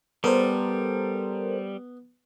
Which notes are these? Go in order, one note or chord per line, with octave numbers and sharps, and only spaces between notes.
G3 B3 A4 A#4 C5